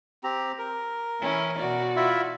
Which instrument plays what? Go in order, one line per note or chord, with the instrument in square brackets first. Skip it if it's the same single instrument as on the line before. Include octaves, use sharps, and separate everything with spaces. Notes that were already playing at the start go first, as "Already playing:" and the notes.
[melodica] C4 G4 A#5
A#4
[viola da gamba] E3 C#4 E4
B2 F#4 D5
[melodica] E4 F4 E5